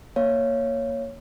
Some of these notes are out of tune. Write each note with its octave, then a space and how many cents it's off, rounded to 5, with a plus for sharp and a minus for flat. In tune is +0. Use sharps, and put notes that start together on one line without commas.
A#3 +0 C#5 +0 F5 -20